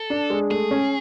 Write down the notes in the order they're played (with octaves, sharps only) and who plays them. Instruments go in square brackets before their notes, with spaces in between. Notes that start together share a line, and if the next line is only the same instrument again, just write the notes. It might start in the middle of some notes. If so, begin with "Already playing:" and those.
Already playing: [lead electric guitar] A4
[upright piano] D4
G#3
[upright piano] A3 [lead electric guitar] G#4
[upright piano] C#4